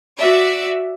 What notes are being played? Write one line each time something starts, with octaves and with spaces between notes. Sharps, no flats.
F#4 D5 E5